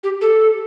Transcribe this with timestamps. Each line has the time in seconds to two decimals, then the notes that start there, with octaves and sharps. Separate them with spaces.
0.04 G4
0.21 A4